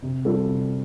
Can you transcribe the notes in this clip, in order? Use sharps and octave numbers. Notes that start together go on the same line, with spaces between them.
C3
G3 C4 F4 A4
C3